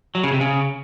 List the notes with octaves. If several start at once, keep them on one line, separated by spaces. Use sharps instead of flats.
F#3
C#3
C3
C#3